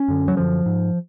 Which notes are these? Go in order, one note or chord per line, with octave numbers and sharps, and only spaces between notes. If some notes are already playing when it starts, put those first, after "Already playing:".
Already playing: C#4
F#2 D3
F#3
F#2 D3 F3
G#2